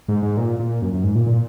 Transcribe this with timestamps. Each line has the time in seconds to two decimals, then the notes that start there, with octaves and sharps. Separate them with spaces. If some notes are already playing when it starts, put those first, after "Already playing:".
0.08 G#2
0.23 G#2
0.37 A#2
0.60 A#2
0.82 F#2
0.94 F#2
1.04 G#2
1.15 A#2
1.27 A#2